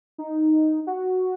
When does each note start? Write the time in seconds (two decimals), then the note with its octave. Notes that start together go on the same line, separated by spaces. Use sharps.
0.18 D#4
0.87 F#4